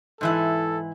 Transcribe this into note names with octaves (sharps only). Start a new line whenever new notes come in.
G#2 E3 E4 A4